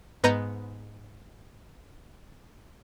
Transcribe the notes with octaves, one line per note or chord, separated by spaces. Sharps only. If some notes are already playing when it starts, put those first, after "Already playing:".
G#2 B3 B4 D#5 A#5 G6